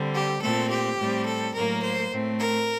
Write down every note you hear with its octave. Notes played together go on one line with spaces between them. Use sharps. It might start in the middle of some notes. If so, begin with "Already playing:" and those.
Already playing: D3 G3 C4
G4
A#2 A3 C4 A4
G4
A2 G3 C4
A4
A2 F#3 A#3 A#4
C5
A2 A3 C4
A#4